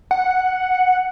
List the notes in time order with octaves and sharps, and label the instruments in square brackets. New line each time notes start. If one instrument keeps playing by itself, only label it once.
[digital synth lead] F#5